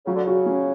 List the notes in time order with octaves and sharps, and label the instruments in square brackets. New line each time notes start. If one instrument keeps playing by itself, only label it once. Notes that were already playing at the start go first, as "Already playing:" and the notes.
[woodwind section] C#3 [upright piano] F#3
[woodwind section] D3
[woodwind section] C#3 [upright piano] F#4
[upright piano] C#4